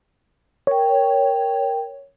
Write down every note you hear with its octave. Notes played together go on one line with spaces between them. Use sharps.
A#4 C#5 G5